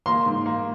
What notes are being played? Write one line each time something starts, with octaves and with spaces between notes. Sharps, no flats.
A#3 C6
G#2
A#3